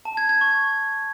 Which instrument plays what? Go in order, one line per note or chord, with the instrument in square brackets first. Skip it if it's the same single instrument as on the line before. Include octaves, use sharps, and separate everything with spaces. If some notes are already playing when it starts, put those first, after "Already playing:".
[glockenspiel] A5
G#6
G#6
C#6